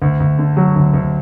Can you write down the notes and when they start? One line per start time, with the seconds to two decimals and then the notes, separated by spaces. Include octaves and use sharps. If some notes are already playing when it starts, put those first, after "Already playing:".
0.02 D2
0.20 D2
0.39 D3
0.57 F#3
0.76 D2
0.94 D2